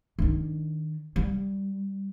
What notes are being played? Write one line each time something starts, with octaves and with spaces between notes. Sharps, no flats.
D#3 D4
G3